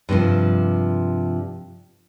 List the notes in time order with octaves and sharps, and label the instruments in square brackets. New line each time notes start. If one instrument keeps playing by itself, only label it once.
[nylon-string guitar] G2 C3 D#3 F3